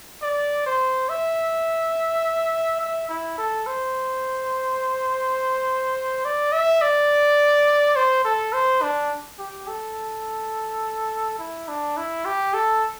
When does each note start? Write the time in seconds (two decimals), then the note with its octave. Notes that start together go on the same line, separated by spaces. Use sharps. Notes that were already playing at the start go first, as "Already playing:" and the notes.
0.23 D5
0.66 C5
1.09 E5
2.81 E5
3.09 E4
3.38 A4
3.67 C5
6.25 D5
6.52 E5
6.81 D5
7.96 C5
8.25 A4
8.53 C5
8.82 D4
9.39 G4
9.68 A4
11.39 E4
11.68 D4
11.97 E4
12.25 G4
12.54 A4